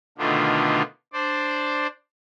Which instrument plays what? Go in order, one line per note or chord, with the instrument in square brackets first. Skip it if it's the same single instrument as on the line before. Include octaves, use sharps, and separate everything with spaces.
[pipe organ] B2 D3 D#3 A3 D4 F4
D4 C5 D5